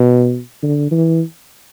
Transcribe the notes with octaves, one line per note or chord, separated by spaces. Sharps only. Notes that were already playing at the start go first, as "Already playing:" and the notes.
Already playing: B2
D3
E3